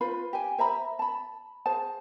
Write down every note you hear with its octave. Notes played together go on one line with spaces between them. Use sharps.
F4 B4 C5 B5
G4 G#5
C5 E5 A#5 B5
A5 B5
G#4 C5 A5